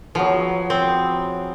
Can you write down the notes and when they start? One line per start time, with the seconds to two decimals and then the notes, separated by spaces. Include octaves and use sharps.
0.15 F3 F#3 B3 G#4
0.70 C4